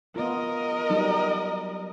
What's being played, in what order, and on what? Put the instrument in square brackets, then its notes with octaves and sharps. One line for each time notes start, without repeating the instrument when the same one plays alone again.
[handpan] B3 F4 [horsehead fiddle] A#4 D#5
[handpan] F#3 G3 D#4